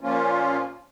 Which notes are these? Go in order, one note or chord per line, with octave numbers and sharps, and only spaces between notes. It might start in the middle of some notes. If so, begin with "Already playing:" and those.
A#2 F3 A#3 C#4 F4